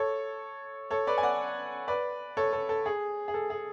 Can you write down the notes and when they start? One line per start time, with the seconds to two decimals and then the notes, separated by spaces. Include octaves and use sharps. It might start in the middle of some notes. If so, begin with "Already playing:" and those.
Already playing: A4 C#5
0.91 A4 C#5
1.07 B4 D5
1.18 G#5
1.23 D5 F#5
1.88 B4 D5
2.37 A4 C#5
2.53 A4
2.69 A4
2.86 G#4
3.28 G#4
3.34 A4
3.50 G#4